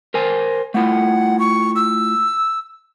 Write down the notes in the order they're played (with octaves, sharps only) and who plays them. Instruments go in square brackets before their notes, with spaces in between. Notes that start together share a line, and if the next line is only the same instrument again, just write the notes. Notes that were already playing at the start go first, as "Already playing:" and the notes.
[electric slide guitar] A#4 C5 G#5
[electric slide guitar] A3 E4 F4 [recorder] F#5
[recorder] C#6
E6